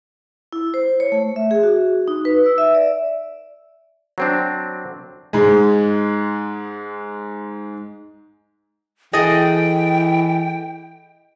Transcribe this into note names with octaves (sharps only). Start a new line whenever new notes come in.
E4
C5
C#5
A3
E5
G#4
F#4
D#4
B4
E6
E5
D5
F#3 C4 D4
G#2 G#3
E3 G#4 A4 D#5 G5